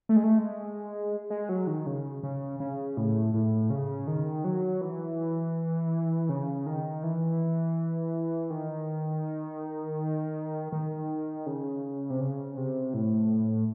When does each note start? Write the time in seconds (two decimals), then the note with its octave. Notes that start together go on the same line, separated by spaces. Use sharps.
0.09 A3
0.16 G#3
0.24 A3
0.39 G#3
1.30 G#3
1.49 F#3
1.67 D#3
1.86 C#3
2.23 C#3
2.60 C#3
2.97 A2
3.34 A2
3.70 C#3
4.07 D#3
4.44 F#3
4.81 E3
6.29 C#3
6.67 D#3
7.03 E3
8.50 D#3
10.72 D#3
11.46 C#3
12.10 C3
12.20 C#3
12.57 C3
12.94 A2